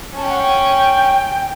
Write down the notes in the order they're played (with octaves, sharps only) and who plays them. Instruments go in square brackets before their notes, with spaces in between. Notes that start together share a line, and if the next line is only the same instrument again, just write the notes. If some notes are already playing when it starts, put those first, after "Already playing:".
[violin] C#4 [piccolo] A5
[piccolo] G5
F#5
G5